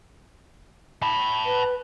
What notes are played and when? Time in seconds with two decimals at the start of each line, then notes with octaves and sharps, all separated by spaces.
1.03 A5 B5
1.46 B4